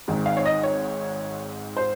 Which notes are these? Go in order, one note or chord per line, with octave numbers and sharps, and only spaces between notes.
G#1 G#2 D#3 G#3 C4
F5
C#5
D#5
C#5
C5